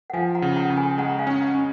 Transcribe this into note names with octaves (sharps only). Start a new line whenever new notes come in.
F#5
F3 F5 G#5
F#5 A#5
C#3
F#5 A#5
C#3
G#5 B5
G#5
G#3 F#5 A#5
A#5
F5 G#5
C#4
F#5 A#5
C#4